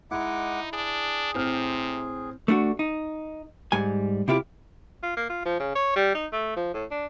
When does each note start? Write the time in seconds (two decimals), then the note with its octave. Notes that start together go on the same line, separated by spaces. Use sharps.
0.11 G#3 D#4 E4 F#5 D6
0.73 D4 G#4
1.34 A2 C3 C4 F6
2.48 A3 D4 F#4
2.79 D#4
3.72 G#2 G3 G#5
4.28 C3 E4 F4 G4
5.03 F4
5.17 A#3
5.29 F4
5.45 F3
5.59 C#3
5.75 C#5
5.96 G3
6.14 D#4
6.32 A3
6.56 F3
6.74 A2
6.91 D4